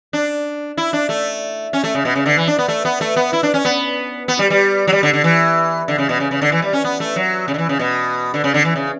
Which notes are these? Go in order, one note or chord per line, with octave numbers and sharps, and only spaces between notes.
D4
E4
D4
A3
C#4
A3
C#3
B2
C#3
D3
E3
D4
B3
A3
B3
A3
B3
E4
D4
C#4
B3
B3
G3
G3
F#3
G3
D3
D3
E3
D3
C#3
B2
C#3
C#3
D3
E3
G3
C#4
B3
A3
F#3
C#3
D3
E3
C#3
B2
D3
C#3
D3
E3
C#3